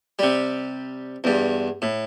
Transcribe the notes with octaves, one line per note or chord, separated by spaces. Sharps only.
C3 G3
E2 G2
A2